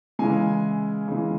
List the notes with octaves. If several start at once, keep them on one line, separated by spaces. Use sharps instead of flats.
C#3 E3 G#3 G#5
C#3 E3 G#3